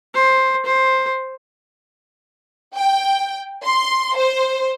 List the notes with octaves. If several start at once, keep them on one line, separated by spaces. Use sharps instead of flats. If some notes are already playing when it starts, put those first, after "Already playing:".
C5
C5
G5
C6
C5